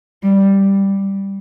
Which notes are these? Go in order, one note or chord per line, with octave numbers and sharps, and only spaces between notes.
G3